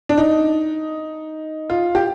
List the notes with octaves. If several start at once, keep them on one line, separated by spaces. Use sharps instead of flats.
D4
D#4
F4
G4